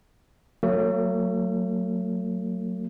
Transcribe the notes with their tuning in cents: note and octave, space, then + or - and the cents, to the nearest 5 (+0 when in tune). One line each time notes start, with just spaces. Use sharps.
F#3 +0 A3 +45